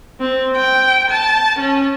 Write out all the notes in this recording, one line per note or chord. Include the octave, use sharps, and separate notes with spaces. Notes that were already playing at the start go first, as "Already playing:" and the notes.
C4
G5
A5
C#4